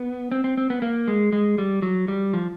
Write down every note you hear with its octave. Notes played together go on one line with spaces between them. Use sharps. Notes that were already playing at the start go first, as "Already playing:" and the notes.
Already playing: B3
C4
C4
C4
B3
A#3
G#3
G#3
G3
F#3
G3
F3